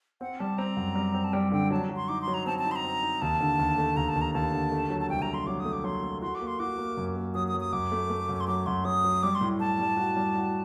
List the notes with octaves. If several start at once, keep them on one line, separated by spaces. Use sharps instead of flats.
C4 F#5
G3 A5
C4 A#5
F#2
G3
C4
A5
G3 G5
D3 G5
F#3 A5
F#3
C6
D#4 D6
C6
F#3
A#5
C4 A5
A5
D#4
C6
A#5
C4
D#4
D#2 A5
D3
D#2
A3
D#2 A#5
A5
D#2
A#5
D#2 A5
D3
A3
F#3
A5
C2 G5
A#5
A3
C6
F#3 D6
D#6
A3
D6
F#3 C6
A3
F#4 C6
D6
A#3
C6
F#4 D6
A#3
F#2
A#3
F#3 D#6
D#6
F#3
D#6
F#2 D6
A3
A3
F#2
C6
F#3 D6
F#2 C6
F#3 D#6
F#3
G3 D6
C6
A2
A2 A5
G3
F#4
G3
F#4